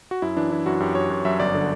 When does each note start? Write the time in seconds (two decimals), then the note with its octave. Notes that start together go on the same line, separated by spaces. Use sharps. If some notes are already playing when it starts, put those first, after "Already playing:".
0.11 F#4
0.22 F#2 E4
0.37 E3 D4
0.51 E3 E4
0.66 F#2 F#4
0.80 F#2 G4
0.95 F#2 C#5
1.10 F#2
1.25 F#2 E5
1.39 G1 D5
1.54 D3